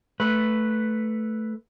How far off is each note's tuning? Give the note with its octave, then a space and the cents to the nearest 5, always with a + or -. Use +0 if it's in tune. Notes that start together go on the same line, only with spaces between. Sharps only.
A3 +0 B4 +0